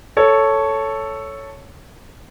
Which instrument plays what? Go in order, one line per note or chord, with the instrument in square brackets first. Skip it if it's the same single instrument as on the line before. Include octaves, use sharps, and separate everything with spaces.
[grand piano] A4 C#5